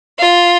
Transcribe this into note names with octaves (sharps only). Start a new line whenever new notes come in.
F4